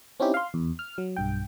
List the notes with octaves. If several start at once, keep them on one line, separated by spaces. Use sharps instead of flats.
C4 C#4 D#4 E4 G4
F5 C6
E2
F6
F#3
B1 G2 G5